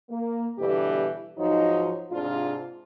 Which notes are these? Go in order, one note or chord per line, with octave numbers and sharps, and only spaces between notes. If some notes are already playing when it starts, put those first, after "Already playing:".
A#3
G2 B2 D3 E3 G3 G4
G#2 F3 F#3 D#4
G#2 C3 D4 F4